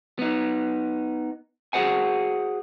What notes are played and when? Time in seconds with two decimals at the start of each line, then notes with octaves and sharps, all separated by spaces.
0.19 B3 D#4
1.73 F#4 G#4 C5 F#5 G#5